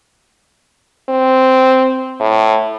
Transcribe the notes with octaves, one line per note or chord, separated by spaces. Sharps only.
C4
A2